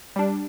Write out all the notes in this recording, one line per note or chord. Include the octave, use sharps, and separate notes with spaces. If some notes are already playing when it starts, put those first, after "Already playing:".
G3 D4